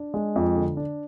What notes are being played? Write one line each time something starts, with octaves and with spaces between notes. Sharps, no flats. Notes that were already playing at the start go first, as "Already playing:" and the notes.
Already playing: D4
G#3
F2
D3
D4